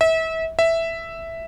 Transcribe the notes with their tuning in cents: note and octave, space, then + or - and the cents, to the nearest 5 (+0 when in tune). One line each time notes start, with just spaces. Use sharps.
E5 -30
E5 +0